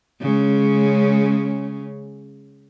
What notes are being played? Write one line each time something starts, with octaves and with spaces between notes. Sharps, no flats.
C#3 G#3 C#4